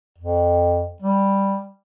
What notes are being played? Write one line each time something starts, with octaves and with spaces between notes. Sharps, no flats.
F2
G3